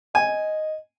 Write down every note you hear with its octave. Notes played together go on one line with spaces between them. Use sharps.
D#5 G#5